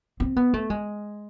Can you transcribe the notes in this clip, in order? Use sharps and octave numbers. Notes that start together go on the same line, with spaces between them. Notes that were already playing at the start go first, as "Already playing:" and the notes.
C4
B3
A3
G#3